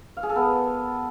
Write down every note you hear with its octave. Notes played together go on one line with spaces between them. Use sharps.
F5
G#4
A4
B3